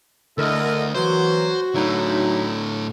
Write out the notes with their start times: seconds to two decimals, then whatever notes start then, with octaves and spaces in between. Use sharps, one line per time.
0.38 D2 D3 E4 A4 A#4 D#5
0.95 E3 F#3 A#3 F#4 C5
1.75 A2 D3 F#3 D#4 E4